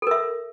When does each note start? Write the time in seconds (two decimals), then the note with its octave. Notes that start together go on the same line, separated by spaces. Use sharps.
0.02 A4
0.07 A#4
0.11 E5